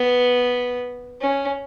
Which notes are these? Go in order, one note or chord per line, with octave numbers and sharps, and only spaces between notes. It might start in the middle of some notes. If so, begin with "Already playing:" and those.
Already playing: B3
C#4